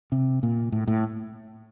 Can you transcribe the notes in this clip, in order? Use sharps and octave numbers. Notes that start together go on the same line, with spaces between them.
C3
A#2
A2
A2